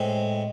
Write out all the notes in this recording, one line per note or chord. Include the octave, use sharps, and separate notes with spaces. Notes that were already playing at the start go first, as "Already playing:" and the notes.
Already playing: A2 G#3 C4